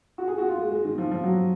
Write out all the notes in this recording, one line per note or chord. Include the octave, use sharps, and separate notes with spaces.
F#4
G#4
F#4
F4
G#3
G#3
D#3
F3
F3
F#3